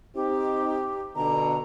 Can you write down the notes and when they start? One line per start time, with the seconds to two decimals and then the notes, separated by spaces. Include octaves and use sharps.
0.15 C4 D#4 G4
1.16 B2 D3 A#5